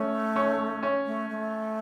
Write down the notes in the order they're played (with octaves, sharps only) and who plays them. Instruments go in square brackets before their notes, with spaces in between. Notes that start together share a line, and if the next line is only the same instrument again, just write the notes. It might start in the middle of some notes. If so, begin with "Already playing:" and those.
Already playing: [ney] A3 [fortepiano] C#4 C#5
[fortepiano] C#4 C#5
C#4 C#5
[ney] A3
A3